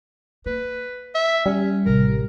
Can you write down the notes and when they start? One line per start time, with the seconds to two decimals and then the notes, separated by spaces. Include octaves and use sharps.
0.46 A#3 B4
1.15 E5
1.46 G3 C#4
1.86 A1 C3 A#4